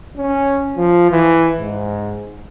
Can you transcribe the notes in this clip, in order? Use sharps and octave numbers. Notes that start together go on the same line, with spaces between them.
C#4
F3
E3
G#2